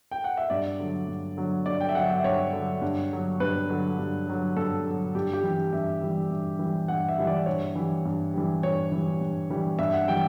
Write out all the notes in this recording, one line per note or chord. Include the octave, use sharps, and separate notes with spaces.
G5
F#5
E5
G2 D5
D3 F#3
G2
D3 F#3
G2 D5
G5
E5
D3 F#3 F#5
E5
G2 C#5
D3 F#3
G2
D3 F#3
G2 B4
D3 F#3
G2
D3 F#3
G2 A4
D3 F#3
G2 G4
G4
E3 G3
G2 E5
E3 G3
G2
E3 G3
G2 F#5
E5
E3 G3
D5
G2 C#5
E3 G3
G2
E3 G3
G2 C#5
E3 G3
G2
E3 G3
G2 E5
F#5
E3 G3 G5